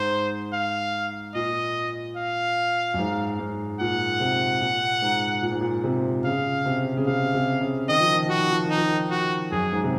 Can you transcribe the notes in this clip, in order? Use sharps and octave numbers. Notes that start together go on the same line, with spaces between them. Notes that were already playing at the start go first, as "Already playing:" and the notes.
Already playing: G#2 C5
F5
A#2 D#5
F5
F#2
G#2
G#2
A#2 F#5
C3
A#2
G#2
A#2
G#2
A#2
C3
C#3 F5
C3
C#3
C3 F5
C3
C#3
D#3 D#5
F3
D#3
F3 F#4
D#3
F3
D#3
D#4
F3
D#3
F#4
F#2 G#4
G#2
C3